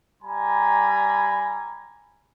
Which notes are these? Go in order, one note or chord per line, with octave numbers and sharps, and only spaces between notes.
G3 G#5 A#5 B5